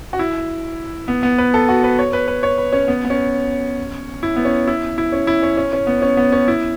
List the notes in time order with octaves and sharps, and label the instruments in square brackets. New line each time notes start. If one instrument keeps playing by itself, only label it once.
[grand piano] F#4
E4
B3
B3
B4
A4
F#4
B4
C#5
B4
B4
C#5
B4
C#4
B3
B3
C#4
E4
B3
C#4
E4
E4
C#4
E4
C#4
C#4
C#4
B3
C#4
B3
C#4
E4